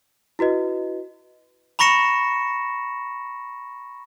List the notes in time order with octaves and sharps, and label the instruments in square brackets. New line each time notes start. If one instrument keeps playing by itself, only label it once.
[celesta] E4 F#4 B4 D#5
[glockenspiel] A#5 B5 C#6 A#6 C#7 E7